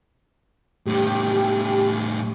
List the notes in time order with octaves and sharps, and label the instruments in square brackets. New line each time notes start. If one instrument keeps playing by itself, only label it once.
[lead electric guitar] A2 G3 [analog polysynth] G4